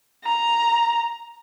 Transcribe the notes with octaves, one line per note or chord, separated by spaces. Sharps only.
A#5